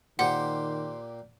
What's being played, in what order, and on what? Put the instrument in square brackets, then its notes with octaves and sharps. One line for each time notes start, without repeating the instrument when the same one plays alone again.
[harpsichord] A#2 A#3 G4 [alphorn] D#3 [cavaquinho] C5 [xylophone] F#5